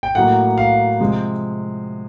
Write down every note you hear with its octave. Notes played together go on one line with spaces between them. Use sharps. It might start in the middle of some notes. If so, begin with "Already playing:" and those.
G5
A2 F#3 A#3 F#5
F5
C3 F3 G#3